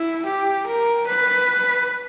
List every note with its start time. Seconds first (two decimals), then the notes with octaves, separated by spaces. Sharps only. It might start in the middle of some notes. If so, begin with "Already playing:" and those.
Already playing: E4
0.26 G4
0.67 A#4
1.07 B4